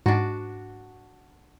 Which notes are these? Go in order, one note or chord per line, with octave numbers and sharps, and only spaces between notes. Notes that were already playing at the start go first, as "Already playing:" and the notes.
G#2 D4 F#4